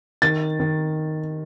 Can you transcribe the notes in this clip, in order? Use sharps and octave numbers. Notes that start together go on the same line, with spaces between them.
D#3 A6
D#3